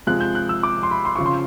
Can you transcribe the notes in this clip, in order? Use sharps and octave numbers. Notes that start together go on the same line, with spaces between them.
C3 F3 G#3 F#6
G6
F#6
E6
D6
C6
B5
C6
C#3 F3 C#6
C6